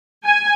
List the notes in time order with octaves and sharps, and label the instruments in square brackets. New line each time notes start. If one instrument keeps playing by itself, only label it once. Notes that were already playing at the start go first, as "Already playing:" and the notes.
[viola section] G#5